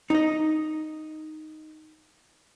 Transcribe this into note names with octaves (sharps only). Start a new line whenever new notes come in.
D#4 D#5